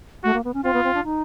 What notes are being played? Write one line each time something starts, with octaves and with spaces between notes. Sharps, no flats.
A3 F#4
A#3
B3
C#4
C4 F4
B3
C4
D4
D#4